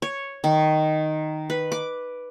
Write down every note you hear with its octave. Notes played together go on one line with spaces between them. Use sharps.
C#5
D#3
B4
D6